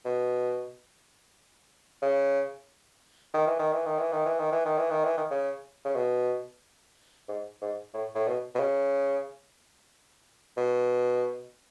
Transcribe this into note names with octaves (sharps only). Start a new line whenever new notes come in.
B2
C#3
D#3
E3
D#3
E3
D#3
E3
D#3
E3
D#3
E3
D#3
E3
D#3
E3
D#3
C#3
C#3
B2
G#2
G#2
A2
A2
B2
B2
C#3
B2